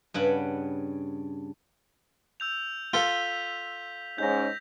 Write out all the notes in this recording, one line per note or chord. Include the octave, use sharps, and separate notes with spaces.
G2 C#3 F#5 B5
E6 G6 F7
F4 A4 G6 B6
G#2 C#4 G6 A#6